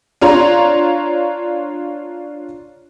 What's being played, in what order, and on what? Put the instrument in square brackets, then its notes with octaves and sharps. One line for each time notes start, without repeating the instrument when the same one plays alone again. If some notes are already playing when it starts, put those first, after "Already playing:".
[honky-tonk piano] D4 F4 C#5 A#5 C6